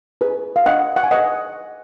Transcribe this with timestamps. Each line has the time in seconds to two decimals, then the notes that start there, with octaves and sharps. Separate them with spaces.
0.21 G#4 B4
0.56 F5
0.66 D4 D#5 F#5
0.96 F#5
1.03 G#5
1.11 G#4 B4 D#5 F#5